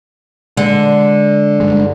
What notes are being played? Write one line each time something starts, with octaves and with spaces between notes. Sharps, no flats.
D3 G#3
G2 G#3